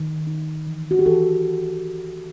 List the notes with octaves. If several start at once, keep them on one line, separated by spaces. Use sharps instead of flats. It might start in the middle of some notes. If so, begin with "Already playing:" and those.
Already playing: D#3
D#4
E3
F#4
G4
E3 A4